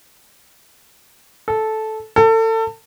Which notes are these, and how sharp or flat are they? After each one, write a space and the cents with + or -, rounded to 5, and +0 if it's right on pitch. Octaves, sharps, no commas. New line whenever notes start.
A4 -10
A4 +30